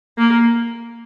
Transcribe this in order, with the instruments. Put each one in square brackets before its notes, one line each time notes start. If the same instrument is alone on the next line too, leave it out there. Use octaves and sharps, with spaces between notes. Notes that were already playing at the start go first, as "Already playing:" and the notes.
[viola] A#3